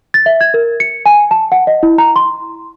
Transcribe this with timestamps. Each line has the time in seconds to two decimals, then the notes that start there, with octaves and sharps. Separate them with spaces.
0.14 A6
0.26 E5
0.41 G#6
0.54 A#4
0.80 C#7
1.06 G#5
1.31 A5
1.52 F#5
1.67 D#5
1.83 E4
1.98 A#5
2.16 C6